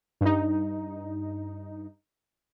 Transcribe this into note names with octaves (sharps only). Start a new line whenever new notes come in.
G2 D#4